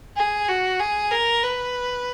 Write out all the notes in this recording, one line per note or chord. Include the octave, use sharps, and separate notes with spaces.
G#4
F#4
G#4
A#4
B4